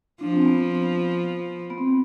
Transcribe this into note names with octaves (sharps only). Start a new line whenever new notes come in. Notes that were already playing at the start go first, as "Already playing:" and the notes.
F3 D4
C4
B3
B3
B3
C4